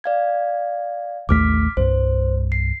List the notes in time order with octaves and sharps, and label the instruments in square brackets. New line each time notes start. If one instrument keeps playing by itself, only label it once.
[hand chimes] D5 F5 G#6
[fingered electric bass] A1 D#2 A3 [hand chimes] D6 F6 B6
[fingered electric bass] C2 G2 [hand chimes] C5
[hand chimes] C7